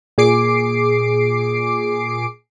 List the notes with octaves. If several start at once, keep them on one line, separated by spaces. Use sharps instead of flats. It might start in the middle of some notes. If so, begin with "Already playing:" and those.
A#2 G#4 D6 C7 D7